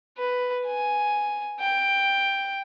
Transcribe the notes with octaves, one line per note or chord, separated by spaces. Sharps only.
B4
G#5
G5